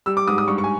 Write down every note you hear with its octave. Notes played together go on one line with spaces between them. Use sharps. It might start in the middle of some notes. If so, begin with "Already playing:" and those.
G3 E6
D6
G#2 D#6
D#6
G2 C#6
C#6
G#5